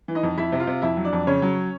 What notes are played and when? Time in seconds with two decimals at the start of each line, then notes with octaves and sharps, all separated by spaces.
0.08 E3
0.15 D#4 D#5
0.23 F2
0.37 F2 E4 E5
0.52 C3
0.60 F4 F5
0.67 C3
0.82 F2 E4 E5
0.97 F#3
1.05 D4 D5
1.13 F2
1.27 C#3 C#4 C#5
1.42 F#3